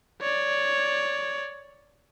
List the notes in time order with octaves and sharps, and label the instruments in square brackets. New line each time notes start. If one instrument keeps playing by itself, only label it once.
[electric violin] C#5 D5